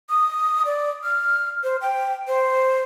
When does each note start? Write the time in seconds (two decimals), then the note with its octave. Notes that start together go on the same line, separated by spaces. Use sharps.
0.09 D#6
0.65 D5
1.04 F6
1.63 C5
1.81 G5
2.27 C5